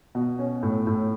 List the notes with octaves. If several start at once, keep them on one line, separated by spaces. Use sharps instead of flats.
B2
C#4
A2
A2